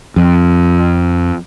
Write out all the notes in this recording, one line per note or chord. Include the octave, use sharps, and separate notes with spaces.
F2